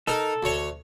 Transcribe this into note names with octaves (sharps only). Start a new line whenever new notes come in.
D#4 A4 A#4
D2 C#5